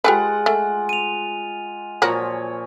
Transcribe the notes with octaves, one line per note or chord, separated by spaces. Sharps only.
G#3 F4 G4 A4 B4 F#5 G#5
A3 G#5
D#7 F7
A#2 F3 F#3 F#4 A#4 C#5